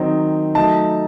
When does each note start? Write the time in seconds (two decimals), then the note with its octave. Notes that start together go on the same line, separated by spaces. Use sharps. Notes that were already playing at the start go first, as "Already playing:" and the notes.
Already playing: D#3 F#3 C4 D#4
0.55 F#3 A3 D#4 A5